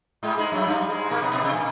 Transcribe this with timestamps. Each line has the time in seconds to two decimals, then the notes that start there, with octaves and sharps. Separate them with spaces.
0.23 G#2 G#3
0.37 G#2 G#3
0.52 F#2 F#3
0.67 G2 G3
0.88 G#2 G#3
1.11 A#2 A#3
1.22 B2 B3
1.33 B2 B3
1.44 C3 C4
1.55 A#2 A#3